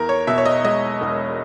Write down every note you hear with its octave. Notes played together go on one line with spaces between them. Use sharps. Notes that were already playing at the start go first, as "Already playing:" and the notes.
Already playing: E2 A#4
C#5
B2 E5
C#5
D#5
G#3 D#5
E1